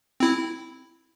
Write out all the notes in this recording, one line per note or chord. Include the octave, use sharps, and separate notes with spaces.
C4 E4